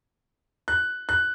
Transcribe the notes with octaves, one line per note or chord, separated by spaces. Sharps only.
F#6
F#6